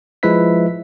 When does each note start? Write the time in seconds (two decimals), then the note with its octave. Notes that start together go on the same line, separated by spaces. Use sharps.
0.23 F3 G#3 E4 B4 E5 B6